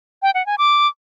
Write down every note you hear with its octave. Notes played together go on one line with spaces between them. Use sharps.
G5
F#5
G#5
D6